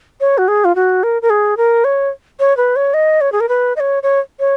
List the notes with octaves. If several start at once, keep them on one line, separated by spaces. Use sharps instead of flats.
C#5
F#4
G#4
F4
F#4
A#4
A#4
G#4
A#4
C#5
C#5
B4
C#5
D#5
C#5
G#4
A#4
B4
D#5
C#5
C#5
C#5